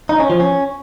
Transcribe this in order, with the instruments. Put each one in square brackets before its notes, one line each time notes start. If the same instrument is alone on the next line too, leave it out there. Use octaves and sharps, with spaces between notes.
[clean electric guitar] D#4
C#4
F3
C#4